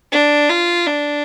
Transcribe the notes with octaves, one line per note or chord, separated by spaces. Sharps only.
D4
F4
D4